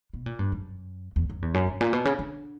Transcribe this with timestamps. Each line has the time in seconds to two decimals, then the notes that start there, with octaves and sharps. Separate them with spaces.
0.13 B2
0.26 A#2
0.39 G2
0.52 F#2
1.16 E2
1.30 F#2
1.42 E2
1.54 F#2
1.67 G2
1.81 A#2
1.93 B2
2.05 C#3
2.19 D3